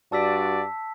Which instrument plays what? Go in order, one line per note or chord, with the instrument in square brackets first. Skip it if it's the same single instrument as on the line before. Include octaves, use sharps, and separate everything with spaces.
[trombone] G2 [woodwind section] F#4 D5 [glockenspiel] A5 E6 B6